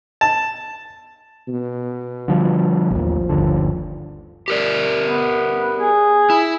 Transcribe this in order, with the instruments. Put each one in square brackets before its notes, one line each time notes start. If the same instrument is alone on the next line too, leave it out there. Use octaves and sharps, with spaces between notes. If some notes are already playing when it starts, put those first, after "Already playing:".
[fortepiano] A5
[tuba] B2
[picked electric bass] D3 F3 G3
[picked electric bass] A1 D#2 [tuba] F3
[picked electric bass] G1 D#2 D3
[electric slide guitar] G4 A#4 D5
[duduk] B3
G#4
[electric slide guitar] E4